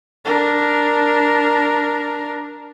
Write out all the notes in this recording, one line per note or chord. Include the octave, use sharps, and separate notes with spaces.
D4 A#4